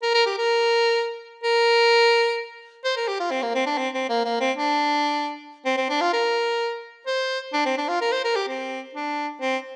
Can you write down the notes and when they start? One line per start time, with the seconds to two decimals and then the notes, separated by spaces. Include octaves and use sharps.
0.02 A#4
0.14 A#4
0.26 G4
0.38 A#4
1.44 A#4
2.85 C5
2.97 A#4
3.08 G4
3.20 F4
3.31 C4
3.42 A#3
3.55 C4
3.66 D4
3.78 C4
3.94 C4
4.09 A#3
4.25 A#3
4.41 C4
4.57 D4
5.65 C4
5.77 C4
5.89 D4
6.01 F4
6.13 A#4
7.06 C5
7.53 D4
7.65 C4
7.78 D4
7.88 F4
8.01 A#4
8.12 C5
8.24 A#4
8.36 G4
8.48 C4
8.95 D4
9.41 C4